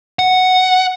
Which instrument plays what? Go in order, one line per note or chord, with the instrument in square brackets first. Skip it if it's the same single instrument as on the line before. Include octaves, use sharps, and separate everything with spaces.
[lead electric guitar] F#5